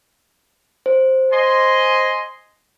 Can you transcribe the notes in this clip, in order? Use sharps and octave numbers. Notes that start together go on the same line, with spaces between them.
C5
D#5 G#5 C6